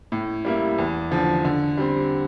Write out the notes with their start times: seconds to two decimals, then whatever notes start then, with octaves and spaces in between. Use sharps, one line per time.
0.12 A2
0.45 G3 A#3 E4
0.78 E2
1.11 D3 F3
1.45 D3
1.77 G3 C4